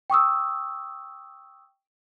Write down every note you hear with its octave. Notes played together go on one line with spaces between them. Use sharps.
G5 C#6 D#6 E6